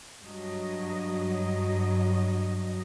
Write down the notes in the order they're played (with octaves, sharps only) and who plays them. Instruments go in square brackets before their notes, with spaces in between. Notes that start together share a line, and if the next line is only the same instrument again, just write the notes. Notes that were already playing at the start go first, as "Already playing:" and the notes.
[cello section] G2 F#3 D#5